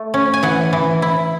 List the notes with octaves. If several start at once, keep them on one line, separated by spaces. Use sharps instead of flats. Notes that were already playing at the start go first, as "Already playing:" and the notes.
Already playing: A3
C#4
G#5
E3 F#5
E3
E4